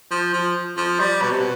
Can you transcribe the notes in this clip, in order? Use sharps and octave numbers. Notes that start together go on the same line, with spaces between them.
F3
F3
F3
G3
B2
C3
B2